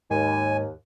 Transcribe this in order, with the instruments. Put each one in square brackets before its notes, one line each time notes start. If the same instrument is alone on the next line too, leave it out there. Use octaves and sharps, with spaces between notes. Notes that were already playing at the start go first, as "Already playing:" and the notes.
[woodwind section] D#2 [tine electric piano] G#2 [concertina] G#5